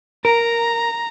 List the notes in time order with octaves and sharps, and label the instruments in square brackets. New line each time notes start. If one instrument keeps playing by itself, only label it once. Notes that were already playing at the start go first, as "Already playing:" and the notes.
[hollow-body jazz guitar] A#4 [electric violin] A#5